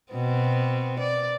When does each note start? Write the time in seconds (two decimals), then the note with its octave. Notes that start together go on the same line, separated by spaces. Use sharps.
0.12 B2 B3 C4
1.00 D5